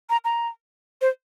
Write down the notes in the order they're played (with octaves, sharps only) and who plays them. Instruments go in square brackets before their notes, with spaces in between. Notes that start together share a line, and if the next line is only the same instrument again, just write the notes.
[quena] A#5
A#5
C5